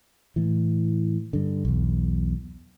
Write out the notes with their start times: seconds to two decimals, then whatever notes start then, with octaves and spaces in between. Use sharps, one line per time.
0.36 A2 E3
1.33 G2 D3
1.65 B1 E2